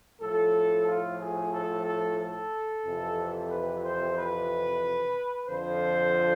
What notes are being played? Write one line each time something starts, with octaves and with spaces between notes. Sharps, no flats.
A2 F3 A4
F4
G#4
A4
A4
A4
F2 C3 E3
B4
C5
B4
F2 D3 F3 C5